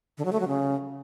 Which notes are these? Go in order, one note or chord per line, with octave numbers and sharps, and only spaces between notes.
D3
F#3
A3
F#3
C#3